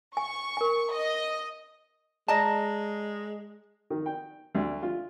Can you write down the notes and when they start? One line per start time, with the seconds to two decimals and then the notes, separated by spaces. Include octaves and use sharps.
0.17 G#5 C#6
0.57 A#4 G#5
0.93 D#5
2.28 G#3 D5 D#5 A5 A#5 A#6
3.90 D#3
4.06 G5
4.55 D2
4.83 F4